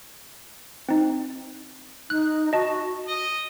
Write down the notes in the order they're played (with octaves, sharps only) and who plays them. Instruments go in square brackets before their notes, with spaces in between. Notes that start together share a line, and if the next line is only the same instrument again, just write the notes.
[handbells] C4 D#4
[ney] D#4 [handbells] F#6
[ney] F#4 [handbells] D#5 A5
[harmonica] D#5